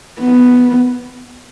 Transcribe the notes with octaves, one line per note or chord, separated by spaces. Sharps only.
B3